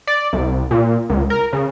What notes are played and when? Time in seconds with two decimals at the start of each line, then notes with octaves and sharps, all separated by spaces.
0.07 D5
0.33 C2
0.71 A#2
1.10 C#2
1.30 A#4
1.53 C#3